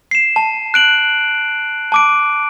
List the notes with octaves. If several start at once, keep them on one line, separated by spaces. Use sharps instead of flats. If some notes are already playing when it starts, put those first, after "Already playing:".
C7 E7
A5
F#6 D7 F#7
A5 D6 D7